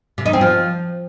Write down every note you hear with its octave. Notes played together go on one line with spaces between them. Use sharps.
C3
D#4
C4
F3